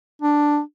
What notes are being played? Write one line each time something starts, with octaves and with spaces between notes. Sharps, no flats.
D4